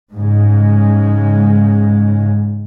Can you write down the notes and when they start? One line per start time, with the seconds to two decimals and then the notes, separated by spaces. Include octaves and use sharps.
0.13 G#2 C#3 G#3